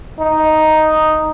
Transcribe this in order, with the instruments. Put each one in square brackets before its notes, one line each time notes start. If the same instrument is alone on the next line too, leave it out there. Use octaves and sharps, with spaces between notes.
[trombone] D#4